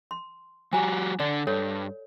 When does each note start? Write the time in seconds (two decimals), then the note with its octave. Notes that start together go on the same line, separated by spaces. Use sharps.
0.11 C6
0.73 F#3 F#4 G4 G#5 A#5
1.20 D3 D4 D5
1.47 G2 A4 C#5